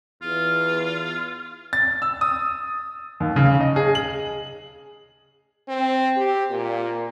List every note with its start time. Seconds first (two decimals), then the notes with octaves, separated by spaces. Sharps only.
0.22 E2 F4
1.73 A6
2.02 E6
2.21 D#6
3.20 D#2
3.36 C#3
3.61 D#5
3.76 G#4
3.95 F#7
5.68 C4
6.17 G4
6.51 A#2